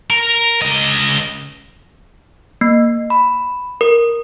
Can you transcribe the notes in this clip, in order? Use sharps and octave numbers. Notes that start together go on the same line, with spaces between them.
A#4
C#2 D#5
A#3
B5
A#4